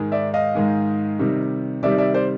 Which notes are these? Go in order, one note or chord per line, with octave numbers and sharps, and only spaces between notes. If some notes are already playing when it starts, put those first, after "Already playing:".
Already playing: G#2 D#3 G#3
D5 E5
D#5 F5
G#2 D#3 G#3
C3 D#3 G3
C3 D#3 G3 D5 E5
D5 E5
C5 D5